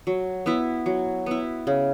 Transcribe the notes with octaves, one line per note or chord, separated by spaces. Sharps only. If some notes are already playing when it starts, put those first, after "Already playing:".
F#3
B3 E4
F#3
B3 E4
C#3